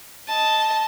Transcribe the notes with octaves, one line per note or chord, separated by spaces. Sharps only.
D#5 A5